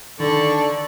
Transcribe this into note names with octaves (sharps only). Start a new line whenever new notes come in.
D3 D#3 A4 D5 C#6